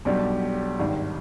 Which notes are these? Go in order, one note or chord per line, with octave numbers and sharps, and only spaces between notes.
B1 B2 G3 D4 G4
G#1 G2 D#3 G3